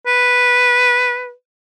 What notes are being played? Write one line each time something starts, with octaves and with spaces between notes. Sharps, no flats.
B4